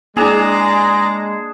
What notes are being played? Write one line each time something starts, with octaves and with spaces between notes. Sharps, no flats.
G#3 A#3 D4 G#4 D5 G#5 A#5 E7